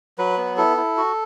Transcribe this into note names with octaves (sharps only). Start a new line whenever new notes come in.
F#3 B4
B3
E4 A4
E4
F#4